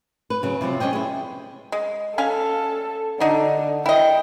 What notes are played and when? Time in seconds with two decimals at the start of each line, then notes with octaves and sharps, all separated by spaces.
0.30 B4
0.43 C#3 F#3
0.61 C3 F3 F#3 C4
0.80 G3 G#3 C#4 D4 D#5 G5
0.93 E4 G#4
1.72 G#3
2.18 C#4 A4 F5 G#5
3.20 D3 D4 D#4 F#4
3.86 E4 D#5 G5